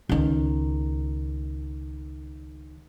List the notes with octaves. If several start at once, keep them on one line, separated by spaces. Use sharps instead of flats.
C#2 D#3